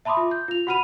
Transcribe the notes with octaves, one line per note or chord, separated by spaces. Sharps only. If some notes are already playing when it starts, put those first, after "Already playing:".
E5 A5 B5 C6 D6 D#6
F4
G6
F4 F7
F#4 F#5 B5 F6 D#7 F7